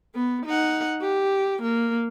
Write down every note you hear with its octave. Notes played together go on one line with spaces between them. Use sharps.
B3
D#4 F#5
G4
A#3